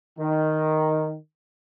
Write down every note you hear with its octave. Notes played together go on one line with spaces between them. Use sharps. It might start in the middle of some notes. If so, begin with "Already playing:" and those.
D#3